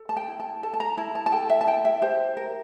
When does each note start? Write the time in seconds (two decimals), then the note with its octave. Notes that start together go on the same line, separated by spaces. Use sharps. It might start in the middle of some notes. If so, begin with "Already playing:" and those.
Already playing: A4
0.09 A5
0.17 G5
0.28 E4
0.40 A5
0.63 A4 A5
0.74 A5
0.80 A#5
0.97 E4 A5
1.15 A5
1.26 A5
1.32 A4 G5
1.49 E5
1.61 A5
1.67 E4 G5
1.85 E5
2.02 G4 C5
2.37 A#4